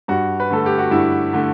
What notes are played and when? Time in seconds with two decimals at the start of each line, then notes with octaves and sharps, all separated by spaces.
0.08 G2 F#4
0.40 B4
0.50 D3 A3 A4
0.66 G4
0.78 F#4
0.91 G2 E4
1.33 D3 A3